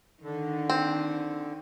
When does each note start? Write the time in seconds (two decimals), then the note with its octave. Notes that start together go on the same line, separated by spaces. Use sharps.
0.23 D3 D#3
0.70 C4